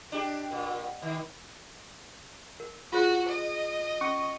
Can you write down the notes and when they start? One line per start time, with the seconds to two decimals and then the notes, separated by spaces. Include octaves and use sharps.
0.12 D4 G4
0.52 A#2
1.02 D#3
2.60 A#4
2.93 F4 F#4 G#4 C5
3.29 D#5
4.01 C#4 C#6